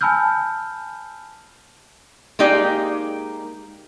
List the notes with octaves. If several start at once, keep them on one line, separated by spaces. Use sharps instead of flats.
G#5 A5 B5 E6 F6 G6
G#3 A#3 D#4 G4 D5